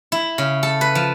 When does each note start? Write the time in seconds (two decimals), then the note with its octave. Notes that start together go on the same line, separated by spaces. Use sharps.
0.12 E4
0.38 C#3
0.63 A4
0.81 B4
0.95 F3